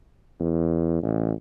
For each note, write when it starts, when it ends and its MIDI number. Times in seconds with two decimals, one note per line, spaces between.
0.40 1.01 40
1.03 1.32 33